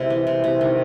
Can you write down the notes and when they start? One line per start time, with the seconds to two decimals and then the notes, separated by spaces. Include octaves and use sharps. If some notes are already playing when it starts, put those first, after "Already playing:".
Already playing: C3 G#3 E4
0.10 E3
0.27 C3
0.44 C3
0.61 D#3